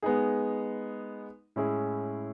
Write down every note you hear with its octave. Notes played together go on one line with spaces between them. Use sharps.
G#3 B3 D#4 G#4
A2 G#3 C#4 E4 G#4